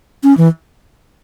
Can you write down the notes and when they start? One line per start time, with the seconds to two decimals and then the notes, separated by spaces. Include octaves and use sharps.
0.24 C#4
0.37 E3